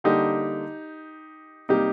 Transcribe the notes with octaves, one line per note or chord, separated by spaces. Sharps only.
D3 G3 A#3 D#4 G4
C3 G3 A#3 D#4 G4